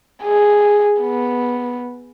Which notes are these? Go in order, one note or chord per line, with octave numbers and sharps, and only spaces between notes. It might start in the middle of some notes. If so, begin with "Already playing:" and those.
G#4
B3